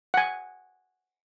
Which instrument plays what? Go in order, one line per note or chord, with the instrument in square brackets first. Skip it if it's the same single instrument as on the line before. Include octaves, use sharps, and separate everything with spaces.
[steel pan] F#5 G#5